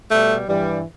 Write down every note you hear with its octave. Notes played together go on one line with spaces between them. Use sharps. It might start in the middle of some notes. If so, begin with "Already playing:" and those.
B2 G3 A3
G2 E3 G3